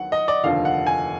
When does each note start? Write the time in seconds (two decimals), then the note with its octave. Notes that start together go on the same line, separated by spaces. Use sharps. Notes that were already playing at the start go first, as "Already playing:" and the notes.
Already playing: D#2 D#3 F#3 F#5
0.12 D#5
0.28 D5
0.44 F1 D#2 D3 F3 F5
0.65 F#5
0.86 G#5